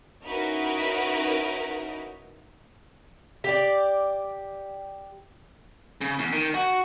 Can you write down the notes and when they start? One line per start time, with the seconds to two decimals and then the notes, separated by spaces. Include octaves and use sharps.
0.24 C#4 D#4 E4 F#4 A#4 B4
3.44 G4 D5
6.01 C#3
6.19 E2
6.32 D#3
6.54 F#4